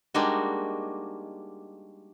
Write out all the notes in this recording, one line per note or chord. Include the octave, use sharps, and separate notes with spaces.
G3 G#3 A#3 D4 D#4 F#4